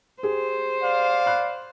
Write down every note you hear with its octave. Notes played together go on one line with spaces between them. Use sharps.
G4 G#4 C5
D5 F5
B5 F#6